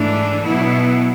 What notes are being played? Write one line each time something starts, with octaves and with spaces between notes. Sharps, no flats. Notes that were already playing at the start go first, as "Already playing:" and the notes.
Already playing: G#2 E3 A3 D4
B2 F#3 B3 E4